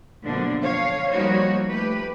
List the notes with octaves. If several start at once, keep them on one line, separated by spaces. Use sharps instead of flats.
F#2 B2 D3 F3 A#3 D4
D3 C#5 F5
F3 G3 A#3 D#4 F#4 C#5
A3 G4 B4